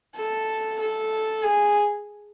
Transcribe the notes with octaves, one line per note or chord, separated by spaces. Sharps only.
A4
A4
G#4